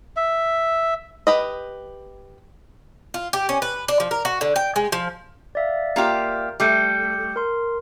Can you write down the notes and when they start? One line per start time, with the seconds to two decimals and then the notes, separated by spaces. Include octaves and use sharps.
0.17 E5
1.27 G4 B4 D#5
3.14 F4
3.33 G4
3.49 C#4
3.62 B4
3.88 D4
4.00 F3
4.11 A#4
4.25 F#4
4.41 D3
4.56 G5
4.76 G#3
4.92 F3
5.55 D5 E5 F5
5.96 A#3 F4 G4
6.60 G3 A3 D6 G6 C#7
7.36 A#4 C6